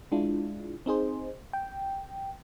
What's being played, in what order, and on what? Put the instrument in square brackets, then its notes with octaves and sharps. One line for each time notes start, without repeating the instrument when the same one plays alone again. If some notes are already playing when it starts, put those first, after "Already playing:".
[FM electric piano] G#3 D4 E4 F4
C4 D#4 G#4 C5
G5